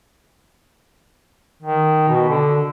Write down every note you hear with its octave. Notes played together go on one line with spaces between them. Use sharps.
D#3
B2
D3